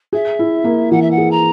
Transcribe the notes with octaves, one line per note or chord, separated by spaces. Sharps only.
G#4 E5
E4
A#3
E3 F#5
E5
F#5
G#4
A#5